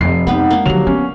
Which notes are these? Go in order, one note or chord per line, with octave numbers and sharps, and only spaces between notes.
F1 F2 C7
G#3 B3 D#4 G4 B4
A#3 D4
D3 F3 F#3 G4 F7
B3 C#4